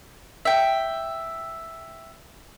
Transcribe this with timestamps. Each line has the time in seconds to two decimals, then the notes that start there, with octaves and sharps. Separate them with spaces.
0.45 E5 G5